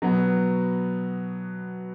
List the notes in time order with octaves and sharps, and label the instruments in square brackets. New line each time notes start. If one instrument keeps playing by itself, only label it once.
[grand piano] B2 F#3 B3